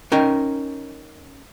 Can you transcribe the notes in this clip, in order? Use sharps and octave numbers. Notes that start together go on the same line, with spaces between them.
C#4 D#4 A#4 G5